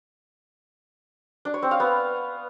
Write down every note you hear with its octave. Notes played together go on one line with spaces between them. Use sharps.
D4
C#5
C4
F5
B3